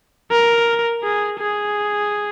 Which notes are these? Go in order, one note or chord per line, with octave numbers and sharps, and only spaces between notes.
A#4
G#4
G#4